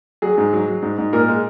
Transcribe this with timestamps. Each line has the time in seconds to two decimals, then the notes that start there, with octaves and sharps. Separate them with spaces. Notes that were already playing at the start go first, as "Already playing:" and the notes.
0.22 F#3 G#4
0.38 G#2
0.53 F#3
0.68 F#3
0.82 G#2
0.98 G#2
1.13 A#2 A#4
1.28 G#3